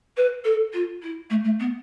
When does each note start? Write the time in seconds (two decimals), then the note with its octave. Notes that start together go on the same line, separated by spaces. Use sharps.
0.17 B4
0.44 A4
0.73 F4
1.02 E4
1.30 A3
1.44 A3
1.59 B3